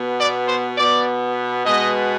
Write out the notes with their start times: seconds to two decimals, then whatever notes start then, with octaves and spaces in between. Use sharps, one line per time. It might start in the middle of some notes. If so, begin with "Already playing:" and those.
Already playing: B2 B3
0.18 D5
0.48 C5
0.77 B2 B3 D5
1.65 B2 G#3 B3 D#5